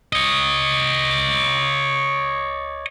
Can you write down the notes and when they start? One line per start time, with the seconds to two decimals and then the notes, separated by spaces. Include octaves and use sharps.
0.13 C#5 D#5